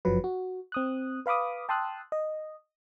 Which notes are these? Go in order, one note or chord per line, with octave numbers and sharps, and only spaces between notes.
G1 F#2 F3 F#3 B4
F#4
C4 D#6 F#6
B4 F5 B5 D6 D#6
G5 A5 C6 D#6 E6 F#6
D#5